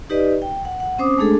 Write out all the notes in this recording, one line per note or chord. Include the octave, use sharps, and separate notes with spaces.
D#4 G4 B4 D5 D#5
G5
F#5
F#5
C4 C#4 C5 D6 D#6
G#3 A3 D4 G#4 A4